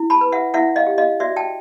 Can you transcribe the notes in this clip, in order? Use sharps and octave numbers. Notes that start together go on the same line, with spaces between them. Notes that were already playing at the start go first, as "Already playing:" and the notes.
Already playing: E4
A5 B5
B4
E5 F#5
E4 E5 F#5
D#5 F5
G4
D#5 F5
F#4 D5 E5
G5 A5